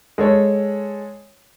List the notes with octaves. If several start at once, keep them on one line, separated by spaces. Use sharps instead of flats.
G#3 A4 C#5